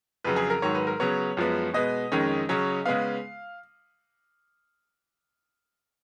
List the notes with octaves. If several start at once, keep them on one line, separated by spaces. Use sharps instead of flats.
F2 C#3 F#3 B4
G#4
A#4
G#2 D#3 F#3 C#5
B4
A#4
C#3 F#3 B3 C#5
F#2 F3 G#3 B3
B2 G#3 B3 D#5
F2 D#3 G#3 C#4
C#3 F#3 C#4
C#3 G#3 B3 F5